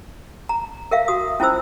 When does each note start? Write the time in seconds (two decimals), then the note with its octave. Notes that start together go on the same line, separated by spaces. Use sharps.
0.49 A#5
0.91 A#4 E5 F5
1.08 F#4 D#6
1.40 C#4 E4 F4 C5 E6